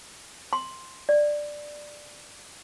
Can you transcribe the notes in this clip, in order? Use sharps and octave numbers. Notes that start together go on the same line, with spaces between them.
C6
D5